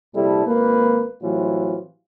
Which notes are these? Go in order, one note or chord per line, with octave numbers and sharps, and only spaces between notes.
A#1 C3 G3 E4 A4
G#1 A#3 B4
A2 E3 F#3 G3 C4 F4